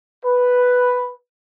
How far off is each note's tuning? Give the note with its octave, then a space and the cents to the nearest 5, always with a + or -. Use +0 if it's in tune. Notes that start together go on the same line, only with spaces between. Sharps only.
B4 +0